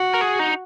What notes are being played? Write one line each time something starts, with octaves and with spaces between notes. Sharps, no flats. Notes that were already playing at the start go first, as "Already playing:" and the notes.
Already playing: F#4
A#4
G#4
D#4